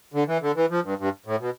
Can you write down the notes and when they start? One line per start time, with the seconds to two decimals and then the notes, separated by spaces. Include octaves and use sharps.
0.14 D3
0.28 E3
0.42 D3
0.56 E3
0.70 F3
0.84 G2
0.99 G2
1.26 A2
1.40 B2